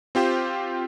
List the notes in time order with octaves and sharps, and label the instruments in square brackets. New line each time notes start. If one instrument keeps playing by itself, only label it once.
[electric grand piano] C4 F4 G4 C5